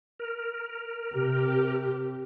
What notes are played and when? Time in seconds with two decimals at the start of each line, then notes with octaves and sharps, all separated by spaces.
0.20 A#4
1.13 C3 G4